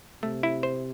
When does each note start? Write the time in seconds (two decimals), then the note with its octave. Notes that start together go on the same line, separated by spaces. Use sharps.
0.23 C3 A3
0.43 E4
0.63 C5